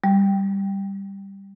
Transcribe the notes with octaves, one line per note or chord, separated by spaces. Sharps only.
G3